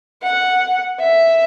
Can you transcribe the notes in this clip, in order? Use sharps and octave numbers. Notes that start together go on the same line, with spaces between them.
F#5
E5